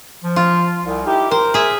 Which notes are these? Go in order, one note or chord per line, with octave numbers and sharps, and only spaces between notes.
F3
F4
C2
D#4 E4 G4
A#4 C5
G#4 E5